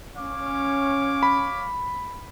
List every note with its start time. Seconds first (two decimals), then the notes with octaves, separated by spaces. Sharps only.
0.16 C#4 C#5 F5 D6
1.23 B5